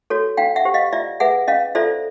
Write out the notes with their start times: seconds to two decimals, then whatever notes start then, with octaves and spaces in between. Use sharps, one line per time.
0.10 F#4 A4 C#5
0.37 D4 F5 G5
0.56 E5 F#5
0.65 G4 C5
0.74 D#5 F5
0.93 F4 D5 E5
1.20 G#4 B4 E5 F#5
1.48 C#4 D#5 F5
1.75 F4 A4 C5 D5 E5